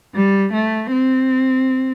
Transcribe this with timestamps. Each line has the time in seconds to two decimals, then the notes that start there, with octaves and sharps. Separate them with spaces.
0.14 G3
0.53 A3
0.92 C4